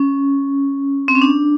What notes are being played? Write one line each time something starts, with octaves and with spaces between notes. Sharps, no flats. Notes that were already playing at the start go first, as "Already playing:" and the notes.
Already playing: C#4
C4
C#4
D4